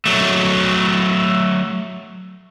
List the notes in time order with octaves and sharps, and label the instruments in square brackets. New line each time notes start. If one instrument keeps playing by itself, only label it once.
[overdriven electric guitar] F#3 A3